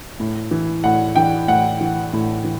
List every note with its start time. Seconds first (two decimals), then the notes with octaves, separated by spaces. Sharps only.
0.20 A2
0.51 E3
0.84 A2 F#5
1.16 E3 G5
1.48 A2 F#5
1.81 E3
2.13 A2
2.44 E3